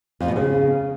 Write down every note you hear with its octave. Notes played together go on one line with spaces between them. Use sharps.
F2
B2
C#3